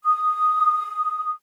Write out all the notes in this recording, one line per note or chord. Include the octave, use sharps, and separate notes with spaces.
D#6